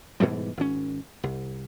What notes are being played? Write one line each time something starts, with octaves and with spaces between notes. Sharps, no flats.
G#2 B2 E3 G3
G#1 C#4
C2